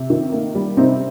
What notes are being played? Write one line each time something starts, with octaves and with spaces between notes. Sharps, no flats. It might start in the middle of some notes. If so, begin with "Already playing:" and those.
Already playing: C3
D#3
A#3
G3
C3 C4 D#4